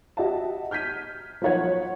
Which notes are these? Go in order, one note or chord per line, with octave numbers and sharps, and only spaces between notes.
F#4 G4 D#5 E5 F#5 A5
F6 G6 G#6 B6 D#7
F3 F#3 D#4 C#5 F#5 G#6